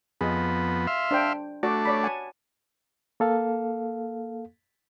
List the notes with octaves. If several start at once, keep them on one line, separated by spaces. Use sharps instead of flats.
F2 B3 G#4 D#5
E5 F5 C6
D4 C5 G5
A3 D4 F#4 D5
C#5 D5 B5
F#5 G#5 A5
A#3 A4 F5